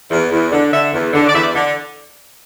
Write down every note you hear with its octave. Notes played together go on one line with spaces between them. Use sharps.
E2
E2
D3
D3 E5
E2
D3
D5
E2 E5
D5
D3